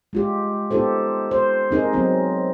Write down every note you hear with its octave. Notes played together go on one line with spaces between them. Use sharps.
G#3 F4 G4
B3 D#4 F4 G4 A4 C5
C5
C4 D#4 G#4 A#4
F#3 B3 C4 D#4